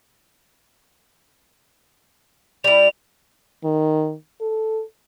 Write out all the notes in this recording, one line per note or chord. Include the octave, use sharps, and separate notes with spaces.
G3 E4 F7
D#3
A4